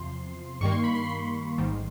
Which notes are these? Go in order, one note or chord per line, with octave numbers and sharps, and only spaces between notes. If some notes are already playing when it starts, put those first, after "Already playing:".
Already playing: E2 C3 F3 C6
G2 D#3 G3 A#3 C#6
C6
B5
C6
B5
C6
A1 G#2 D#3 G3